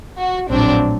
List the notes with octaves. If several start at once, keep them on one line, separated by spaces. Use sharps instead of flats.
F#4
A#1 A2 F#3 C4 D4